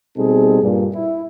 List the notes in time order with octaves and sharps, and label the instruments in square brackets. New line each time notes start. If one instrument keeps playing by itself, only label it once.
[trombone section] B2 G3 C4 D#4 G#4 A4
G2 A#2
E4